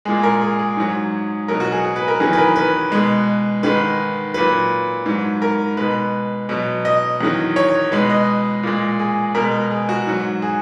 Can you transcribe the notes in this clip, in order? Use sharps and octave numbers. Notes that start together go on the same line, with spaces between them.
A#2 G#3 G#4
A#4
G#4
G#4
G#2 F#3
B2 F#3 A#4
F#4
G#4
G#4
B4
A#4
E2 D#3 F#3 G#4
B4
A#4
B4
B2 G#3
G#2 D#3 G#3 B4
A#2 F#3 B4
G#2 F#3
A#4
B2 G#3 B4
B2 F#3
D#5
E2 D#3 F#3
C#5
B2 G#3 B4
D#5
A#2 G#3
G#4
B2 G#3 A#4
G#4
F#4
G#2 F#3
G#4